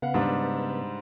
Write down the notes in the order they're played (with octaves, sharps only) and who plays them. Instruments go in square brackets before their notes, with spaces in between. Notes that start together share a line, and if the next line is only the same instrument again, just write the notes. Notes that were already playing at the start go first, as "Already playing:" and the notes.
[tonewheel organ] C#3 B3 B4 [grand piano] F5 F#5
[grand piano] G#2 G3 D4